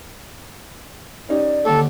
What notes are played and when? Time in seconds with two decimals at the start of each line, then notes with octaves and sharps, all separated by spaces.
1.29 C#4 D#4 G4 D5
1.65 D#2 D3 A4